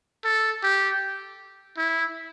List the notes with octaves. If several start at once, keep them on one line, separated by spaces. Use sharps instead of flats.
A4
G4
E4